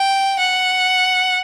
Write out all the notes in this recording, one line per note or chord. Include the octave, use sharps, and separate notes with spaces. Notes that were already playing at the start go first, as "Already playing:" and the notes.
Already playing: G5
F#5